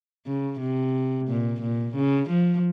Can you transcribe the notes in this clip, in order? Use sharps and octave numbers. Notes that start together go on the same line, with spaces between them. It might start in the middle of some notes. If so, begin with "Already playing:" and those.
C#3
C3
A#2
A#2
C#3
F3